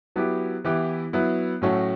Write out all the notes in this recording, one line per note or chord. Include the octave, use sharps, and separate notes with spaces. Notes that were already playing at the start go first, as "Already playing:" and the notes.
F#3 B3 E4 G4
E3 B3 E4 G4
F#3 B3 E4
A2 F#3 A3 C#4 F#4